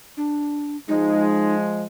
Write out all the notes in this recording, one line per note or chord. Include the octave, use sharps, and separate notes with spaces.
D4
F3 G#3 D#4